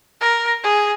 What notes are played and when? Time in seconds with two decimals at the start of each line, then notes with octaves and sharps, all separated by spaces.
0.21 A#4
0.63 G#4